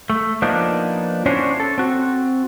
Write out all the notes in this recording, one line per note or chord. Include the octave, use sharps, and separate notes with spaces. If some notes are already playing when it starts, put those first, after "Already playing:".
A3
F3 A#3 B3 D4 D#4
C#4 D4 E4 F#4 C5 C#5
A4
C4 F#4